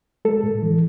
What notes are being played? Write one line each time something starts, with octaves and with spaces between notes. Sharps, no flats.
G#3 A4
A2
E3